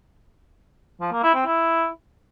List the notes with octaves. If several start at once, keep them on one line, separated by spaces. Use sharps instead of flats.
F3
A#3
E4
C4
E4